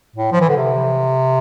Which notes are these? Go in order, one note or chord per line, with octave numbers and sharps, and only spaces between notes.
A2
F3
E3
D3
C3